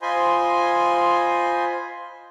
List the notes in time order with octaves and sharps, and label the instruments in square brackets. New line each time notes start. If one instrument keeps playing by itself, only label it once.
[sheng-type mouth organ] F4 C5 D#5 G#5 B5 C6